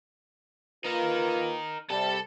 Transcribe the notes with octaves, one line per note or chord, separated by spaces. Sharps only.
A#3 D#4 F4 A#4 B4
C3 G3 A4 A5